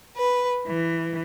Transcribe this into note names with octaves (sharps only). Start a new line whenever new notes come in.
B4
E3